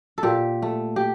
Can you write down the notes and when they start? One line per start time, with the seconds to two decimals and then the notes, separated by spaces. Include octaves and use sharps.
0.18 A4
0.23 A#2 G4
0.62 A3
0.96 G4